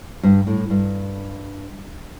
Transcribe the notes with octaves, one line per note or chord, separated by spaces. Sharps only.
G2
A2
G2